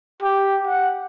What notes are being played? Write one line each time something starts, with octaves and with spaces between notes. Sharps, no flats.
G4
F#5